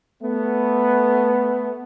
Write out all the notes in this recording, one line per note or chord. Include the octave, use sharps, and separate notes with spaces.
A3 B3